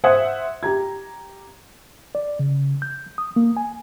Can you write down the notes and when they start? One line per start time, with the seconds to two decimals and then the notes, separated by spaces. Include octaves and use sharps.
0.04 C5 E5 F#5 D#6 G#6
0.63 G4 A#5 G#6
2.15 D5
2.39 C#3
2.82 G6
3.18 D#6
3.36 A#3
3.57 G#5